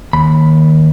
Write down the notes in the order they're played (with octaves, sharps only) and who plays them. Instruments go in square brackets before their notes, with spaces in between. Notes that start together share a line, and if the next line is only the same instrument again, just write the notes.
[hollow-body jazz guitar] D#2 B5